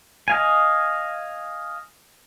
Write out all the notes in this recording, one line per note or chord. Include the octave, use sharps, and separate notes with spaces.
D#5 F5 G#5